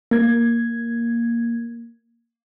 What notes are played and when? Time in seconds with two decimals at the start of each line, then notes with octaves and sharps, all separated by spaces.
0.11 A#3 G#6